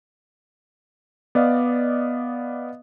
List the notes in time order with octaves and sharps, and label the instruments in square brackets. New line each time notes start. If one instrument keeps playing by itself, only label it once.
[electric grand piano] B3 D5 D#5 F5